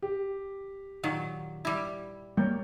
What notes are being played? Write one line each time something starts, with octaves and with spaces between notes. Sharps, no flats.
G4
A#2 D#3 F#3
G3 E4
G3 A#3 C#5 G6